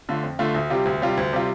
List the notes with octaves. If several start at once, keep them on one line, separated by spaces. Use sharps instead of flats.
D3 A3 F4
F2
D3 A3 F4
D2
C3 G3 F4
D2
C3 G3 F4
D2
C3 G3 F4